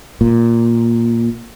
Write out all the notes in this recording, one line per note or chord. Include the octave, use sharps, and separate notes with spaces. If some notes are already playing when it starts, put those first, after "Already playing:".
A#2